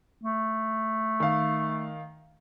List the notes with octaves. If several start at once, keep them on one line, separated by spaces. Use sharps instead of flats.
A3
D#3 F5